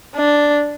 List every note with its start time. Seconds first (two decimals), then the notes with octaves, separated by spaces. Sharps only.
0.15 D4